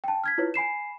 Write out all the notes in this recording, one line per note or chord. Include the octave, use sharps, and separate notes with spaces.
G5 A5
F6 G#6 B6
E4 F4 B4 C#5
G#5 B5 C7 E7